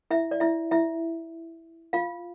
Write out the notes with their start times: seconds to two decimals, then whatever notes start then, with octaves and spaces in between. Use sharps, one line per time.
0.11 E4 E5
0.31 D5
0.40 E4 E5
0.71 E4 E5
1.93 F4 F5